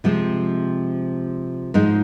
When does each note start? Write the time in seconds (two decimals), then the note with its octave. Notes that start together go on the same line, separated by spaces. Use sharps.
0.04 C3 F3 G#3 C4
1.74 G#2 F3 G#3 D#4